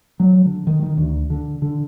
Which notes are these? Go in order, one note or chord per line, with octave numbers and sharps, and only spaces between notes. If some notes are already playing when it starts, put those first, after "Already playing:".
F#3
D3
D#3
D#3
D2
D3
D3